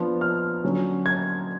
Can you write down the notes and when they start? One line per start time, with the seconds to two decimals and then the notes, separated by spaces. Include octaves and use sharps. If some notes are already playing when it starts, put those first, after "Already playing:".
Already playing: F3 B3 D4
0.21 F6
0.64 D3 F#3 C#4
1.06 G#6